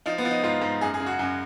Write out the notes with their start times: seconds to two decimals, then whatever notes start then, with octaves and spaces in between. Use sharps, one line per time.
0.06 F3 D#4
0.18 B3
0.25 F3
0.31 D#4
0.44 G#2 F4
0.62 G#2
0.81 F#2 G#4
0.94 G#4
1.00 C#3
1.06 F#4
1.19 F#2